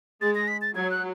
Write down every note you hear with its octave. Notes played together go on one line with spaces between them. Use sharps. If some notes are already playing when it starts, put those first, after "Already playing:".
G#3 A6
A#6
B6
A6
F#3 G#6
F#6